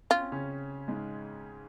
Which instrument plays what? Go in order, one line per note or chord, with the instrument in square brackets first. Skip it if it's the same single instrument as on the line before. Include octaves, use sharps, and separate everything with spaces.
[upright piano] C#4 [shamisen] F4
[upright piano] C4
C#3 C#4
G#2 G#3